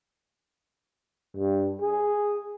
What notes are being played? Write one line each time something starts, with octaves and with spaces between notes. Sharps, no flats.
G2
G#4